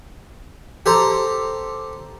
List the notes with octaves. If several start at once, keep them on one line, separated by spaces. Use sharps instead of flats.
G4 A4 C5 A#5